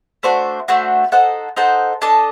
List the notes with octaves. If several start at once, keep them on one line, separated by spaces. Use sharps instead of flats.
A3 D4 F#4 C5
A3 D4 F#4 C5
D#4 A4 C5 F#5
D#4 A4 C5 F#5
D4 A4 D#5 A5